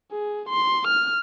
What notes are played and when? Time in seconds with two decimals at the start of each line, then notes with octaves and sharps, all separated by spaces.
0.12 G#4
0.49 C6
0.88 F6